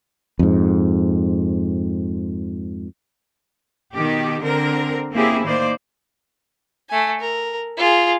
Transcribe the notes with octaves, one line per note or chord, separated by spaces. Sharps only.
F2 G#2
B2 D#3 G4
D3 C4 A#4
A#3 C4 C#4 E4 G4 G#4
A2 D#3 A#3 C5 D5
A3 G#5
A#4
F4 G#4